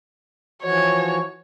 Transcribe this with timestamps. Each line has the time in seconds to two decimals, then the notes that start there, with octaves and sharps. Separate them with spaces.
0.63 E3 F3 F#4 C#5